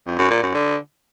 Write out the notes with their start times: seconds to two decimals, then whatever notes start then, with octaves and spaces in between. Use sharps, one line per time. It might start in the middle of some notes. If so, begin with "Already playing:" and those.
0.07 F2
0.19 F#2
0.31 A#2
0.42 F#2
0.54 D3